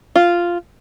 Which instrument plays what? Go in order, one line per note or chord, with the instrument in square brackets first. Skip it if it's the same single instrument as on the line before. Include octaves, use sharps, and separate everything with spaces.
[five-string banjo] F4